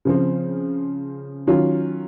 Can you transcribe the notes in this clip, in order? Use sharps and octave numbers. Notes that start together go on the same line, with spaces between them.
C#3 F3 C4
D#3 F#3 C#4 F4